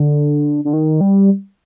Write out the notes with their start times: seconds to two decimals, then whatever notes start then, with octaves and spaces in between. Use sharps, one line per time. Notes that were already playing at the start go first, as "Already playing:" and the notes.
Already playing: D3
0.65 D3
0.73 D#3
1.01 G3